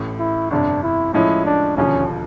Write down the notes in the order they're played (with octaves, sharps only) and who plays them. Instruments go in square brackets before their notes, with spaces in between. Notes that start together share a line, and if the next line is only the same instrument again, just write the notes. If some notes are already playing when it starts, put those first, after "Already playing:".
Already playing: [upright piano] A1 A2 E3
[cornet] E4
[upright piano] G1 F2 C3 [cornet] D4
[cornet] E4
[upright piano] A2 F3 G#3 C#4 [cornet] E4
[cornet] D4
[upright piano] E1 D#2 D3 F3 [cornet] C#4